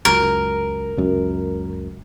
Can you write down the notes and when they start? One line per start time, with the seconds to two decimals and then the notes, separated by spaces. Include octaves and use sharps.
0.05 C#2 F#2 A#4
0.97 C#2 F#2